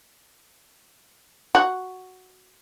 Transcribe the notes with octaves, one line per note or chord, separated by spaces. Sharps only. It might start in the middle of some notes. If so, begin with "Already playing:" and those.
F#4